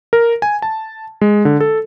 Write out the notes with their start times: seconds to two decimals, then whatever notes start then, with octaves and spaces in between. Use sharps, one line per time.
0.13 A#4
0.42 G#5
0.62 A5
1.21 G#3
1.45 D3
1.60 A4